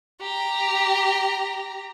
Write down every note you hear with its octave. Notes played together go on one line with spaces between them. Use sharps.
G4 A#5